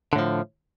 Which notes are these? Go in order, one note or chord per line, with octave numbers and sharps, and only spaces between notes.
A2 D3 F3